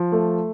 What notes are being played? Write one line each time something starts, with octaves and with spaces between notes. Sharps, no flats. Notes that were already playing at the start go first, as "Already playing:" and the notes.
Already playing: F3
A3